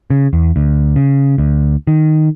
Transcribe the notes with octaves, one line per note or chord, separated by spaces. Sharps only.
C#3
E2
D2
C#3
D2
D#3